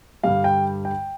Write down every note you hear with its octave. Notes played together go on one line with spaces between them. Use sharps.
G2 D3 G3 F5
G5
G5